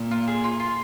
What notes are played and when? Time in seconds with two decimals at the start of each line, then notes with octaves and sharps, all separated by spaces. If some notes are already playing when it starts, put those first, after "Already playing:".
Already playing: A#2
0.11 F4
0.27 G#4
0.44 F4
0.60 F4